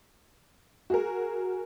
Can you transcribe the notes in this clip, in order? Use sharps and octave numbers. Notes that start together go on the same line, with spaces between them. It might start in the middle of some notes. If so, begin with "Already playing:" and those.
F#4 G#4 A#4